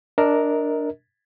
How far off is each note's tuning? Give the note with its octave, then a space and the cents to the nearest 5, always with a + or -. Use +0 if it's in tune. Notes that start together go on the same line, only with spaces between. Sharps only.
D4 +0 A#4 +0 D#5 +30